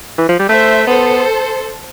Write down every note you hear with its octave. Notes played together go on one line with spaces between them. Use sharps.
E3
F3
G3
A3 C5 E5
B3 A4 C5